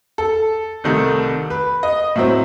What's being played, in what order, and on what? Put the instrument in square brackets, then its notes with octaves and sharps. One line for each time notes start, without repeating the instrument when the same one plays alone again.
[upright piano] A4
C2 C3 D#3 A3
B4
D#5
A2 F#3 C4 E5